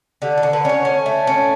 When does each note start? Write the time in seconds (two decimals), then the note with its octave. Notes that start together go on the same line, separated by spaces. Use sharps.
0.22 D3 G4
0.38 A4
0.43 D3
0.53 B4
0.65 C#4 C#5
0.85 C#4
1.06 A3
1.27 C#4